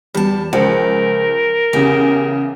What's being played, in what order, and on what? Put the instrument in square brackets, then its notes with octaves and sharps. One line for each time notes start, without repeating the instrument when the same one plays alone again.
[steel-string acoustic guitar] E2 A5 [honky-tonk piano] G3
[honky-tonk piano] C#2 [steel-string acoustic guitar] F3 [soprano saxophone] A#4
[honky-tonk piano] E2 C#3 [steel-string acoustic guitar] G4